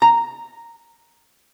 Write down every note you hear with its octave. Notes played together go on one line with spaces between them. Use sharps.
A#5